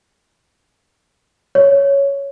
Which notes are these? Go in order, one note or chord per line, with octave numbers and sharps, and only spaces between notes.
C#5